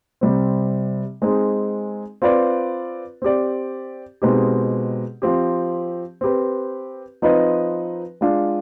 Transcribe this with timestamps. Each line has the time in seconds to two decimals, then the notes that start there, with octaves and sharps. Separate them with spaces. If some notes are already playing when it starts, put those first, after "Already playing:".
0.21 C3 G3 C4
1.22 G#3 C4 D#4 G#4
2.22 C4 F4 B4 D5
3.22 C4 G4 D5
4.22 B2 G#3 C4 D#4 G4
5.22 F3 C4 G4
6.21 C4 G4 B4
7.22 F3 C4 D#4 B4 D#5
8.21 G#3 D4 F4